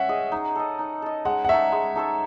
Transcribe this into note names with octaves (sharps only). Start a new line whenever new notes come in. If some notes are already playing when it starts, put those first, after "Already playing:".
Already playing: C#4 E5 F#5
G#4 D#5
D#4
A4 D#5
D#4
A4 D#5
G#3 F#5
F#5
D#4 A4 C#5 E5
G#3
D#4 A4 C#5